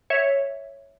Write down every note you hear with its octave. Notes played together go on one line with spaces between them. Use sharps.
C#5 E5